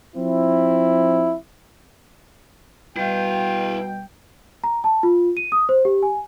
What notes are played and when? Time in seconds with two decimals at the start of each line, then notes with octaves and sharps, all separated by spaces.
0.16 F3 C4 E4
2.96 B2 G3 E4 F5 G5
4.64 A#5
4.84 A5
5.03 F4
5.37 D#7
5.52 D#6
5.69 C5
5.85 G4
6.03 G#5